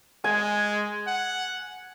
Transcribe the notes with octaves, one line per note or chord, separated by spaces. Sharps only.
G#3 G#5
F#5